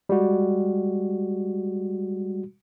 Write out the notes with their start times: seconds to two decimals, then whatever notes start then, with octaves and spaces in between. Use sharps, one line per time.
0.09 G3 G#3 F#4